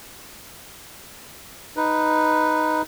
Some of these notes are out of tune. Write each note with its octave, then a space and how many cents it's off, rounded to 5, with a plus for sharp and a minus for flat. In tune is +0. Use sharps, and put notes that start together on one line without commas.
D#4 +0 B4 +0